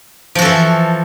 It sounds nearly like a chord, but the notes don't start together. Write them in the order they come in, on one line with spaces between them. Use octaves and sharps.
F3 F#4 A4 E3